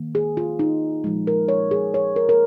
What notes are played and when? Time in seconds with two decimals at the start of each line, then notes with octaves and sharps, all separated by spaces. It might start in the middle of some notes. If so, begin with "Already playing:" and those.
Already playing: D#3 A#3
0.15 G#4
0.37 F4
0.59 D#4
1.04 A#2 F3 G#3
1.27 A#4
1.48 C#5
1.71 G#4
1.94 C#5
2.16 A#4
2.29 A#4